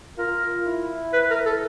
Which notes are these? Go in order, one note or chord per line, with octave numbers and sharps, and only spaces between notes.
F4 A#4
E4
B4
A#4
A4